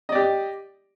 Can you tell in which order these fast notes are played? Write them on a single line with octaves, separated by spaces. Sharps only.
D#5 D5 G4